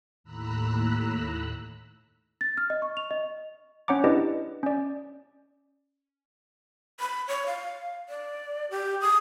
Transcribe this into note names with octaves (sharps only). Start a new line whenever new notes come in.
D#2 A2 A#5 B5 E6 F#6
A6
F6
D#5
C#6
F7
D#5
C#4 C#5 F#5 A#5 D6
D4 E4 G4 B4 D5 D#5
C#4 D5
B5
C#5
F5
D5
G4
D#6